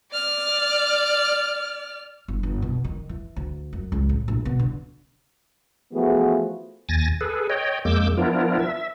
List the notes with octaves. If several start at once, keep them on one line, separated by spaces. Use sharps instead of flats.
D5 F6
G1
G1
B2
D#3
E3
D2
F#2
C#2
A2
A#1
B2
D3
E3 F3 A3 B3 F#4 G#4
D#2 G#5 A6 A#6
G#4 A4 B4
C#5 D#5 G5
F2 G#3 A#3 D6 E6 G6
F3 B3 D4 E4 F4 A#4
E5